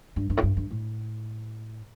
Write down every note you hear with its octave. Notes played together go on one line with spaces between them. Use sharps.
G2
G2
A2
G2
G2
A2